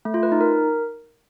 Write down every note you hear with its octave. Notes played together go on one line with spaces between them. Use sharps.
A3
F4
B4
D#4
A#4